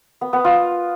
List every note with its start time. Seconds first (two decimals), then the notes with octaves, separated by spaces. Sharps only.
0.21 B3
0.33 B3
0.45 F4